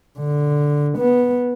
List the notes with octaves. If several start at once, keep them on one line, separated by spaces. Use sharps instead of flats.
D3
B3